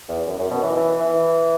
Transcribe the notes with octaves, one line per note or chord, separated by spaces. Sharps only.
E2
F#2
F#2
B2
E3
E3
E3